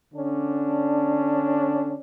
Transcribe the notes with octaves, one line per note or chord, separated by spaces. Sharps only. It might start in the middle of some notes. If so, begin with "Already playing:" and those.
D3 C#4 D4